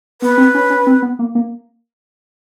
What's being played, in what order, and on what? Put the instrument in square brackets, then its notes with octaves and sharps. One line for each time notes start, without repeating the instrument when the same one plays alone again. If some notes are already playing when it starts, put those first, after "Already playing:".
[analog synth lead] B3 [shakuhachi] B4
[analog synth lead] C4
C#4
C#4
C4
B3
A#3
A#3